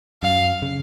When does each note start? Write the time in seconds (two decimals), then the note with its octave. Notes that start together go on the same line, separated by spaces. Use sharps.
0.22 F#2 F5
0.62 C#3